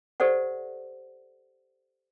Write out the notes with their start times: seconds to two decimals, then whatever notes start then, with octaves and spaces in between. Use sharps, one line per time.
0.20 G4 A4 C5 D5 F#5